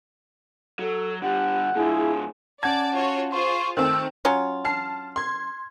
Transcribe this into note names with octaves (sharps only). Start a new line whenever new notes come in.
F#3 A4
D3 G3 G4 F#5
A2 D3 E4 F4 G#4
C#4 D5 F#5 A5 G#6
F4 F#4 C#5
F4 G#4 C5 C6 C#6
D#3 A3 C4 C5 A5 E6
F#3 C#4 F4
A5 F6 C7
C6 G#6